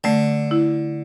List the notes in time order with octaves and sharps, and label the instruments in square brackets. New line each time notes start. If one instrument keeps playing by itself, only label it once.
[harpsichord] D3 [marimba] A3
[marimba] E4